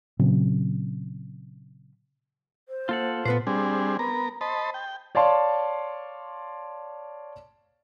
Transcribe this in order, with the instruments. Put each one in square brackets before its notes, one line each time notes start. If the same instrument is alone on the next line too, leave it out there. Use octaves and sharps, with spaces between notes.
[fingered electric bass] A#2 C#3 F#3 C4
[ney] C5
[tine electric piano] A#3 [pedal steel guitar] F4 A4 F#5
[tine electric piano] A#2 [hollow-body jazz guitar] B3 B4 C5
[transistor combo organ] G3 C4 D4 G#4
B3 A#4 A#5
C5 D#5 A5 B5
G5
[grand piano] C#5 D5 F5 A5 C6